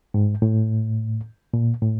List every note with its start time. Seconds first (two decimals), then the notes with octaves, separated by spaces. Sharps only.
0.14 G#2
0.42 A2
1.54 A#2
1.82 A2